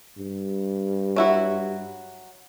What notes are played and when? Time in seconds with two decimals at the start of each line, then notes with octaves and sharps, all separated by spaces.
0.18 G2
1.16 F#3 E4 F#4